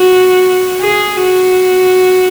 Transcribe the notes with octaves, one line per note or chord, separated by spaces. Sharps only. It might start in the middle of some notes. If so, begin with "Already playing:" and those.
Already playing: F#4
G#4
F#4